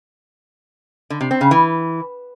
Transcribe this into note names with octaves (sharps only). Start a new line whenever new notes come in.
D3
C3
C4
C#3
E3